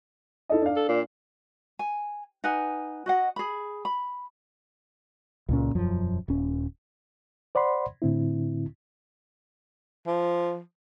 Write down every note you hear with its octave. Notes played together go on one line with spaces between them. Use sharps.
E4 A4 D#5
D4 F5
A4
A#2
G#5
D#4 B4 F#5 G#5
F#4 D#5 F#5
G#4 B5
B5
C#2 A#2 C#4
E1 F#2 F3
D#1 C#4
C5 D5 F#5 B5 C6
A2 D3 C4 E4
F3